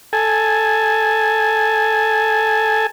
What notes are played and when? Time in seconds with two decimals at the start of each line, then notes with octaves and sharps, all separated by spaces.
0.13 A4 G#5